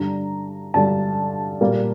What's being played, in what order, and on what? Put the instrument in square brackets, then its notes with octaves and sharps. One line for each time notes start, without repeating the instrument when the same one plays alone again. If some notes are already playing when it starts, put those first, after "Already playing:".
Already playing: [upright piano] G2 D3 G3 D4 A#5
G2 D3 G3 D4 A5
A#2 G3 A#3